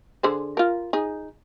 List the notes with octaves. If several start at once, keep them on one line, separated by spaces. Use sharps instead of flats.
D3 G#4 C5
F4 A#4
D#4 G#4